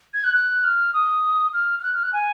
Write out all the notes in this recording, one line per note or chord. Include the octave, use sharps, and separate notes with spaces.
G#6
F#6
F#6
F6
D#6
F6
F6
F#6
F6
F#6
G#5